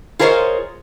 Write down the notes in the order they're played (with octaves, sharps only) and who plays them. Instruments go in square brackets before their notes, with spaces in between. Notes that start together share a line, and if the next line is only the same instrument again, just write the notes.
[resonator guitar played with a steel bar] F4 G#4 A#4 C5 C#5 D#5